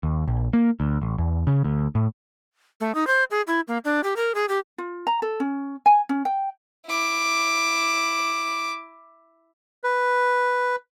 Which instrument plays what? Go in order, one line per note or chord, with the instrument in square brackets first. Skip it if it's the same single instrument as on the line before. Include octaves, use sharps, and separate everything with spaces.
[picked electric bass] D#2
A#1
A#3
D2
A1
E2
C#3
D2
A2
[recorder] A3
D#4
C5
G#4
E4
A#3
D4
G4
A#4
G#4
G4
[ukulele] F4
A#5
A4
C#4
G#5
C#4
G5
[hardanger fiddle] E4 D6
[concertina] B4